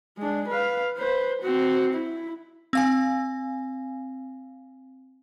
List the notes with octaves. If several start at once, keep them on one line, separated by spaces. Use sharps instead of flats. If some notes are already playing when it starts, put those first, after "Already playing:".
G#3 D4
B4 F5
B4 C5
C4 F#4
E4
C4 F5 G#5